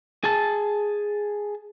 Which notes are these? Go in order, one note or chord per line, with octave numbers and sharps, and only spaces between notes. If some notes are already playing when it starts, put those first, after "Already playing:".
G#4 A5